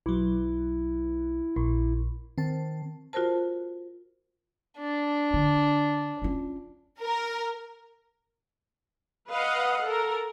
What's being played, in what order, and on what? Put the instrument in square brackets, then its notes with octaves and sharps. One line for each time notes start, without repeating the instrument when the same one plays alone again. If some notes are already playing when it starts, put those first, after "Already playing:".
[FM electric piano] B1 F#3 [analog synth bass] E4
[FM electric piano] A#1
[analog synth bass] D#3 [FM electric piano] C4 A5
[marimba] F4 F#4 A#4 C5 A5
[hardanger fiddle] D4
[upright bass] D3
C#4 F4
[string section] A#4
[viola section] B4 D#5 F5 F#5
A4 A#4